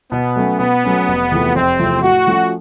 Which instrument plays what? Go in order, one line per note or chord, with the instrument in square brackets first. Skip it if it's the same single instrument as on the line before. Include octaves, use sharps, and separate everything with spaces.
[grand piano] B2 [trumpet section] B3
[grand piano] F#3 A3 C#4
[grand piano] B2 [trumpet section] B3
[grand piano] F#3 A3 C#4
F1
E2 C3 F3 A3
[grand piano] F1 [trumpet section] C4
[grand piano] E2 C3 F3 A3
[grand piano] A2 [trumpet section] F#4
[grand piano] F3 A3 C#4